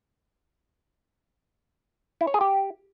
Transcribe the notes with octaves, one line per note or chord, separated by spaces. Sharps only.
E4
C#5
G#4
G4